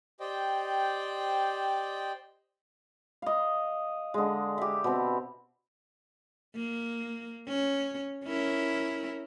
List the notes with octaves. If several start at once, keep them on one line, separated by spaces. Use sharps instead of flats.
G4 C5 D5 D#5 G5
D#5 F5
D3 G#3
G4 E5
B2 C4
A#3
C#4
C#4 E4 A#4